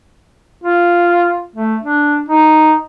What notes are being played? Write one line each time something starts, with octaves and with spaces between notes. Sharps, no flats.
F4
A3
D4
D#4